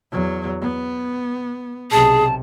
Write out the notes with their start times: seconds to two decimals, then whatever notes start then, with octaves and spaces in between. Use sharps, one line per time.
0.12 E2 F#3
0.62 B3
1.91 B1 C3 G#4 A5